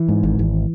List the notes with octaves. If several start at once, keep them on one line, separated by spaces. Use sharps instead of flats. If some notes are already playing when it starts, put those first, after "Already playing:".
Already playing: E3
G#2
G#1
G#1